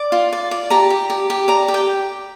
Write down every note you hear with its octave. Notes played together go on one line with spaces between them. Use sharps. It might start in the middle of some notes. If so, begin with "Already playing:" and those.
Already playing: D5
F4
D5
D5
G4 A#5
G4
G4
G4
D5 A#5
G4
G5